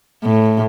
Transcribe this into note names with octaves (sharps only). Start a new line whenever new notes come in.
A2